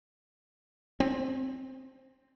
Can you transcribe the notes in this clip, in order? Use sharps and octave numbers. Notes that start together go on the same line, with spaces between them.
C4